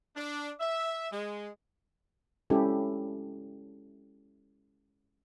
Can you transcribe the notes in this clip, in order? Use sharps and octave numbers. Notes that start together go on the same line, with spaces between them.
D4
E5
G#3
G#3 C#4 E4 G4 A4